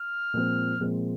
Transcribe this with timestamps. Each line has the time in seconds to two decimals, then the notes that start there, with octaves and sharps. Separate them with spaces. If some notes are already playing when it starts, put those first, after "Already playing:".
Already playing: F6
0.34 A#2 F3 G#3 C4
0.80 A#2 F3 G#3 C4